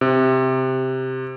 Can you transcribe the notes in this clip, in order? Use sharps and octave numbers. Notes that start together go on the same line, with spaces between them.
C3